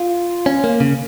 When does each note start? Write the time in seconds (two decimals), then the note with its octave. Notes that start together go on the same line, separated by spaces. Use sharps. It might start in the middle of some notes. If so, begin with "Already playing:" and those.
Already playing: F4
0.46 C#4
0.64 A#3
0.80 C#3